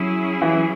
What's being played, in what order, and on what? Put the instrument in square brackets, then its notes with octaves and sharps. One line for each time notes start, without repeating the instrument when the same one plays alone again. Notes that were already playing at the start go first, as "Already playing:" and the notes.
Already playing: [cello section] F#3 C#4 E4 G#4
[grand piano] E3